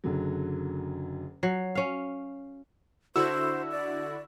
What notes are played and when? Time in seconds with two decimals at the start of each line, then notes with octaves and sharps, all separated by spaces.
0.04 F#1 D3 F#3
1.43 F#3 C7
1.75 C#4 F5
3.16 D3 E4 F#4 C5 E6
3.71 D5